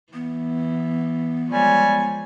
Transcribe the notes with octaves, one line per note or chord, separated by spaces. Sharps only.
E3 B3
F3 G3 G#3 C#5 G#5